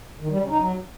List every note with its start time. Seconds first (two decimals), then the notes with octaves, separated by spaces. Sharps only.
0.20 D#3
0.30 G3
0.40 C#3
0.49 D#4
0.59 F#3